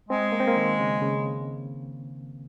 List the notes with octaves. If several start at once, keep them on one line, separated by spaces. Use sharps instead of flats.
G#3 C4
A#3
C4
A#3
D#3
C#3
C#3